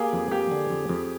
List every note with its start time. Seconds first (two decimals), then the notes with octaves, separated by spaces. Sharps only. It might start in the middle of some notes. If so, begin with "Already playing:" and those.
Already playing: A#3 G4 G#4
0.13 F2
0.31 A#3 G4
0.51 D3
0.70 F2
0.89 F2